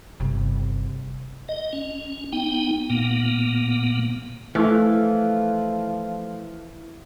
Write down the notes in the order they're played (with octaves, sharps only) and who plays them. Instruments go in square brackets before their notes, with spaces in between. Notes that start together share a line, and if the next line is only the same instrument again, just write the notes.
[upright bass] G1 C3
[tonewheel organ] D#5
C#4
B3 D#4 G5
A#2 A#3 B3
[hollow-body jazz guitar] E3 [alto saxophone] F3 [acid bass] A3 [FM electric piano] E4 F6